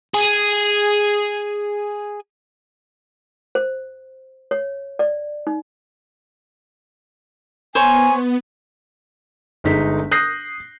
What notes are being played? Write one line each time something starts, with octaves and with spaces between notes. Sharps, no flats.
G#4 G#5
C5
C#5
D5
D#4
B3 C5 C#5 G#5
G1 D3 G#3 D#4 B6
D#6 F#6 G6 A#6 C7